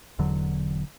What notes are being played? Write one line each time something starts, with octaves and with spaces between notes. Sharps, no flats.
E1 E2 D3 F#3